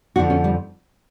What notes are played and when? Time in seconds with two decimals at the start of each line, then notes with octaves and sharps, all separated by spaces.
0.16 F2 D3 F3 F#4
0.30 C#4
0.44 G3